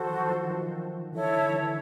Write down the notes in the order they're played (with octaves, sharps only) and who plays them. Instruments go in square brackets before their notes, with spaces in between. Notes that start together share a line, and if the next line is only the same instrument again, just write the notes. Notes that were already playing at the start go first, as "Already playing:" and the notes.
Already playing: [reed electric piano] D#3 F3 [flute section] F#4 A4 C5
[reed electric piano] E3 F#3
D#3 F3
D#3 F3
[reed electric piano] D3 E3 [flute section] E4 A4 C#5
[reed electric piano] D#3
D3 E3